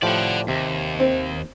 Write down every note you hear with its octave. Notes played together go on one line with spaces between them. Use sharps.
A2 F3 G4 D5 F#5
D#2 C3
C4